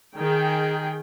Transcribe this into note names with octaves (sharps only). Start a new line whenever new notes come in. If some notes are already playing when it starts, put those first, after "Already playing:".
D#3 G#4 G5